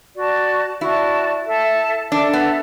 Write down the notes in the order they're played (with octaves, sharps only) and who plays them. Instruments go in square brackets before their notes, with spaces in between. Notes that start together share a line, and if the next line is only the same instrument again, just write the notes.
[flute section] F#4 D5 A5
[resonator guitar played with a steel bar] E4 [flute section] F#4 D5 A5
[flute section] A4 E5 A5
[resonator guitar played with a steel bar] D4 [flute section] A4 E5 A5
[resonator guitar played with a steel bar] B3